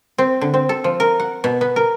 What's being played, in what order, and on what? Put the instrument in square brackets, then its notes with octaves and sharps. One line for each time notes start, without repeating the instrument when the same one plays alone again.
[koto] C4
D3
C4
A4
F3
A#4
F#5
B2
B3
A#4